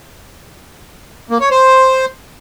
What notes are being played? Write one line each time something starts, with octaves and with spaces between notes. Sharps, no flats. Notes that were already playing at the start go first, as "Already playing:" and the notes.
A#3
C#5
C5